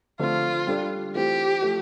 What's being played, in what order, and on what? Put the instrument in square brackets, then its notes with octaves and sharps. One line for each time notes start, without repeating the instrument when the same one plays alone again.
[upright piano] D3 F3 A3 C4 [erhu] F4
[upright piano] G3 D4 A4 D5
[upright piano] E3 A3 C4 F4 [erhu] G4
[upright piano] F3 A3